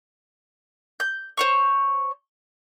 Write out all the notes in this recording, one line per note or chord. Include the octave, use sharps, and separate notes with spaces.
G6
C5 C#5 C#6